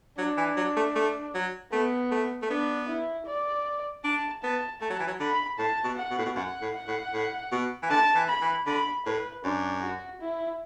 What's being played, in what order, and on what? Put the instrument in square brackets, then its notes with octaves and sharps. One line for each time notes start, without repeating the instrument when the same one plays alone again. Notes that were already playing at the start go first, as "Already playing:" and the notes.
[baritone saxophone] F#3 [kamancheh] D4
[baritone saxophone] E3
F#3
A3
A3
F#3
[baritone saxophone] A3 [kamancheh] B3
[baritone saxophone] A3
A3
[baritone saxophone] B3 [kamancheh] D4
[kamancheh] E4
D5
[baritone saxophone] D4 [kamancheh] A5
[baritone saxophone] B3 [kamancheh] A5
[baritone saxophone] A3 [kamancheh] A5
[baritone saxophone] F#3
E3
F#3
[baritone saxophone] D3 [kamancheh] B5
[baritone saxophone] A2 [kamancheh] A5
[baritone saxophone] B2
[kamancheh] F#5
[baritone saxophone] B2
A2
B2
[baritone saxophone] F#2 [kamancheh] F#5
[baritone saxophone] A2
[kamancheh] F#5
[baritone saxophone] A2
A2
B2
E3
[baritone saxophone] D3 [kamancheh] A5
[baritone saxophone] E3
[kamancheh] B5
[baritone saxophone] E3
[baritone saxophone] D3 [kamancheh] B5
[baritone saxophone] A2 [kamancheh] B4
[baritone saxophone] F#2 [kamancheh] D4
[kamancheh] F#4
E4